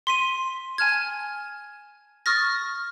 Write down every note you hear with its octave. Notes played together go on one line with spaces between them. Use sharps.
C6 B6 D#7
G#5 A5 F6 G#6
C#6 D#6 F6 A6 A#6